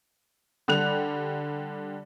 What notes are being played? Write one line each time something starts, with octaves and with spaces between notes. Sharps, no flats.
D3 G3 F#6 F7